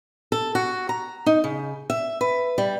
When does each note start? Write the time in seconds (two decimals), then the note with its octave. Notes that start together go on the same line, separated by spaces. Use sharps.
0.32 A4
0.55 F#4
0.89 A#5
1.26 D#4
1.44 C#3
1.90 E5
2.21 B4
2.58 G3